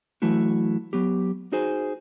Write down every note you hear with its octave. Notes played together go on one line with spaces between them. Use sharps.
E3 F#3 A3 E4 F#4
F#3 B3 G4
D#4 F#4 G#4 C5 G#5